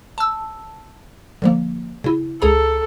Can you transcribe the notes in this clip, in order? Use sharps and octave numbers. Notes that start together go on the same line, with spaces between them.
A5 E6
D3 F3 A#3
C#3 E4
C#2 G#4 A4 A#5